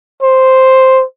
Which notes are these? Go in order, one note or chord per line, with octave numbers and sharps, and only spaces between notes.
C5